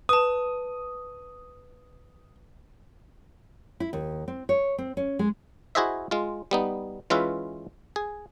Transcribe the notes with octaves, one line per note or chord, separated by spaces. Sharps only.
B4 A5 D#6
E4
D#2
C4
C#5
C4
C#4
G#3
E4 F#4 G#4 C5 D#5 E5
G#3 F4
G3 B3 D#4
E3 G#3 C#4 F4 B4 E5
G#4